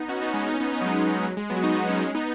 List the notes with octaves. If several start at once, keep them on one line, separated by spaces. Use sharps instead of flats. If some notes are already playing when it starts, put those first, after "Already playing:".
Already playing: B3 D#4
C#4 F#4
B3 D#4
G#3 C#4
B3 D#4
C#4
B3 D#4
B3 D#4
F#3
G#3
F#3
G#3
F#3 B3
F#4
B3 D#4
B3 D#4
G#3 C#4
G#3 C#4
B3 D#4